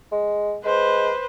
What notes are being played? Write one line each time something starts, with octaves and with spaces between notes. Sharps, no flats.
G#3
G#3 B4 C5